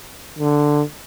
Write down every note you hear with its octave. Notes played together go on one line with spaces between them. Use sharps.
D3